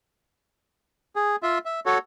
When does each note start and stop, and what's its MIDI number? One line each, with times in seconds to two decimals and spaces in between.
1.16 1.36 68
1.43 1.58 65
1.43 1.58 76
1.65 1.80 76
1.86 1.98 66
1.86 1.98 69
1.86 1.98 73